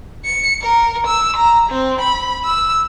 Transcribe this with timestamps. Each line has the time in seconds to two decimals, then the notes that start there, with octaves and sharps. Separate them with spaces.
0.25 C#7
0.62 A#4
1.07 E6
1.36 A#5
1.69 C4
2.01 B5
2.45 E6